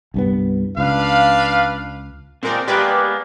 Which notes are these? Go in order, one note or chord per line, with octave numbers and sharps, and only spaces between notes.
C2 G2 B3
C#2 D4 B4 F5
A#2 G#3 C4 D#4 A#4 D5
G#3 A#3 B3 G4 B4 D5